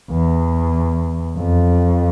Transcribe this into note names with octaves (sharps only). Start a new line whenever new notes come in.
E2
F2